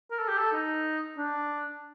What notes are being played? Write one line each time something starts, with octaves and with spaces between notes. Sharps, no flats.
A#4
A4
G4
A4
D#4
D4